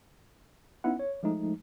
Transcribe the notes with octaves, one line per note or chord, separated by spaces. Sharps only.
B3 C#4 D#4 E4 F#5
C#5
F3 G#3 A3 D#4